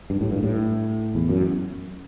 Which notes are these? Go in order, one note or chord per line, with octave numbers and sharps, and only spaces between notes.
G2
A2
G2
A2
E2
F#2